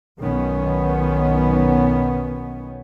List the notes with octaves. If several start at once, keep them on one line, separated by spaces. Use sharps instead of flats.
B1 D#3 B3 C#4